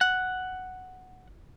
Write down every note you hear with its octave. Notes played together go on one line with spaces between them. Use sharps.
F#5